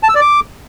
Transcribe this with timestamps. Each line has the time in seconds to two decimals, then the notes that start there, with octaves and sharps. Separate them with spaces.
0.03 A5
0.09 E6
0.15 D5
0.21 D6